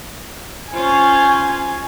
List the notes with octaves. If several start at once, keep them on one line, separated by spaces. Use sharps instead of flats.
C#4 F4 C5 G#5